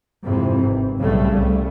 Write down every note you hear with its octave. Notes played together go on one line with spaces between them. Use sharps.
F2 G#2 C3 E3
G#1
B1 A2 C#3 G3 A3
C2 G3